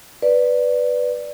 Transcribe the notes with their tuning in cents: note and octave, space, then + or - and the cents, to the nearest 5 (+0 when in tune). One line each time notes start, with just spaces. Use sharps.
B4 +0 D5 +0